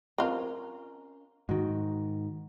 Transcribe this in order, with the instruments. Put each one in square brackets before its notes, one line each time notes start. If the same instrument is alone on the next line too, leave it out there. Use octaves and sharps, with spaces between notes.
[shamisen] C4 F4 [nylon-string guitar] C#4 A#4
[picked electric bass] G#2 D#3 [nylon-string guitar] F#4